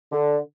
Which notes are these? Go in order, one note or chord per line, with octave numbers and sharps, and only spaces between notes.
D3